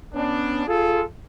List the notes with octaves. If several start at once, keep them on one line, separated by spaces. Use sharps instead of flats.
B3 C#4 D4
F4 G#4 A4